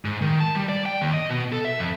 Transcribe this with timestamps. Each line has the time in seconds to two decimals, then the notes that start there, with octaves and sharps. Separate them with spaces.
0.05 G#2
0.22 D#3
0.40 A5
0.55 G3
0.69 D5
0.86 G5
1.02 D#2
1.14 D#5
1.29 B2
1.53 A4
1.65 E5
1.79 F2